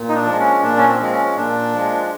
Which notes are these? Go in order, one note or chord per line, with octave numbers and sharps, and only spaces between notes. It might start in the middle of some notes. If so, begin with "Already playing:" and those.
Already playing: A#2
D#4
D4
F3 G#3
C#4
A#2 D4
C#4
C4
F3 G#3 C4
C#4
A#2 D4
F3 G#3